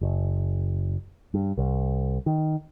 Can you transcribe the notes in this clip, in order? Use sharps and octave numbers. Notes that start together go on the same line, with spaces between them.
F#1
G2
C2
D#3